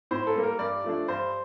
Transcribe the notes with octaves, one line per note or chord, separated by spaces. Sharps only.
A2 C5
A4
G3 A#3
A#4
G2 D5
F3 A3 D4
G2 C5